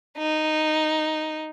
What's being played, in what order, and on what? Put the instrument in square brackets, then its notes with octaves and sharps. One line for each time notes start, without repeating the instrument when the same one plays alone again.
[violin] D#4